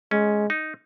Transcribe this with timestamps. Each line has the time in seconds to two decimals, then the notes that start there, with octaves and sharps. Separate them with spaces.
0.11 G#3 C#4
0.50 D#4